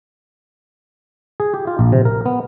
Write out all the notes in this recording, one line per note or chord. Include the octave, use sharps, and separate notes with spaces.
G#4
G4
F4
A#1
C3
A#4
B3